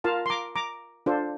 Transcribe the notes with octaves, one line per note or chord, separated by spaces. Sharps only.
F4 A#4 F5 A5
C6
A#5 D6
A#5 D6
D4 F4 A4 C5